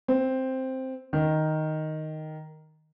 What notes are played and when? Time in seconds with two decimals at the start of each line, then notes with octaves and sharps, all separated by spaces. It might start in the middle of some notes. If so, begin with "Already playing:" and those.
0.08 C4
1.13 D#3